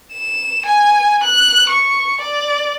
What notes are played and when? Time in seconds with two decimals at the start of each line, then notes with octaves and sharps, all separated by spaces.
0.13 E7
0.66 G#5
1.23 F#6
1.69 C#6
2.21 D5